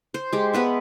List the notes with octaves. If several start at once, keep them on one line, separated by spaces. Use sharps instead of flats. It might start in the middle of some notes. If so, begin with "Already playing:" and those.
C5
G#3 G4
G#3 B3 B4 E5